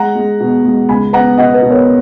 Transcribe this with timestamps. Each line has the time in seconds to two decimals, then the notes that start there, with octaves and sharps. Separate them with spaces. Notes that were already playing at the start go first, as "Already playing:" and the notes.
Already playing: G#3 F#5 A#5
0.15 G#3
0.40 B2
0.65 G#3
0.89 C#2 G#5 B5
1.13 B3 F#5 A#5
1.37 B2 D#5 F#5
1.54 B4 D#5
1.62 B2
1.70 A#4 C#5